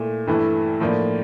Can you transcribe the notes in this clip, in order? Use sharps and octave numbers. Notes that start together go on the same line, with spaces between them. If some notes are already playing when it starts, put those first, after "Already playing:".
Already playing: A#2 A3 E4
G2 E3 A3 E4
A2 F3 A#3 D4